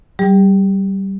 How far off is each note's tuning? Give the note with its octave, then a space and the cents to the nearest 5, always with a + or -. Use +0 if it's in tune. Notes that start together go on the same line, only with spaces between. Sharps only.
G3 -20 G4 +40